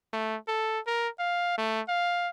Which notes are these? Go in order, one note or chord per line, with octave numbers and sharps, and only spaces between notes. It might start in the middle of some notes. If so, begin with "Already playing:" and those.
A3
A4
A#4
F5
A3
F5